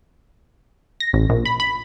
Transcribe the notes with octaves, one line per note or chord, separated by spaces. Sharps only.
A#6
A1
A#1
B5
B5